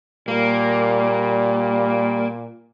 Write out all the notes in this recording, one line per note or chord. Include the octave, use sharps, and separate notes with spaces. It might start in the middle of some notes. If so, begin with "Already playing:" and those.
A#2 G3 A#3